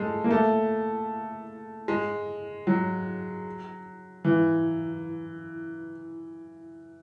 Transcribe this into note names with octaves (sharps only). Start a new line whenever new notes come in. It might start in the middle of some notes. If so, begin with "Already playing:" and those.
Already playing: G#3 A3
A#3
A3
G#3
F#3
E3